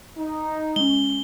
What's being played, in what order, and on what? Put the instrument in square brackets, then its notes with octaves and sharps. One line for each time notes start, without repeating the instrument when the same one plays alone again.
[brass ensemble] D#4
[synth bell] G#3 C#4 [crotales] G7